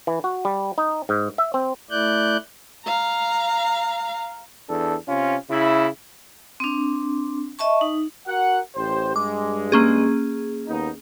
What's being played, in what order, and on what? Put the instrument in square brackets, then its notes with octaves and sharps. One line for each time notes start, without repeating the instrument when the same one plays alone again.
[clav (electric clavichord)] E3
F#4
G3
D#4
G#2
E5
C4
[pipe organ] A3 E4 D5 F#6 G6
[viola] F5 A#5
[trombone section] E2 D4 A4
C3 C#4 F4
C#3 E4
[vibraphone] C4 D4
D#5 E5 A5 C#6
D#4
[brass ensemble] F#4 A#4 F#5
A1 G4 C5
[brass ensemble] G2 G#3 [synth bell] D6
[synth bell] A#3 C#4 G#4
[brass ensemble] D#2 B3 D#4